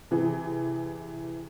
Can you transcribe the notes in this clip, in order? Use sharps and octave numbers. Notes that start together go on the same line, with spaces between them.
C3 E3 G#4